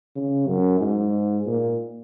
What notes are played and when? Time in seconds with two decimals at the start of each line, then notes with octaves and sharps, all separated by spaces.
0.16 C#3
0.47 F#2
0.80 G#2
1.47 A#2